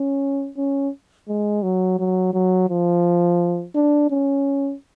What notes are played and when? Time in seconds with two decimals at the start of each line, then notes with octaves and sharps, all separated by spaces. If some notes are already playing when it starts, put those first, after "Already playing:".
Already playing: C#4
0.57 C#4
1.28 G#3
1.63 F#3
1.99 F#3
2.34 F#3
2.70 F3
3.75 D4
4.10 C#4